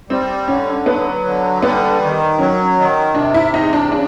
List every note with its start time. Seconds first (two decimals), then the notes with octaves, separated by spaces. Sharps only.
0.10 G3 C4
0.48 D3 C#4
0.86 F#3 B3
1.25 D3
1.62 G3 B3
2.01 D#3
2.38 F#3 C#4
2.77 D#3
3.15 C3 D4
3.34 E4
3.54 E2 D#4
3.73 D4
3.92 C#3 D4